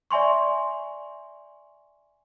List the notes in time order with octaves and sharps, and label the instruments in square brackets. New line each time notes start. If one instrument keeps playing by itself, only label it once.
[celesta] D5 E5 G#5 C6 C#6